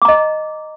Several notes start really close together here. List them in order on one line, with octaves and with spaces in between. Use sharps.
D6 A#5 D#5